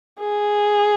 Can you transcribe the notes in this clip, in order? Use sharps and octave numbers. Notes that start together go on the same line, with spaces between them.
G#4